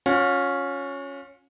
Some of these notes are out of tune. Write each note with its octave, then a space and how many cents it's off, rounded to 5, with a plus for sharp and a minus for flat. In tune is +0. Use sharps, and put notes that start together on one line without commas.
C#4 +0 F4 +45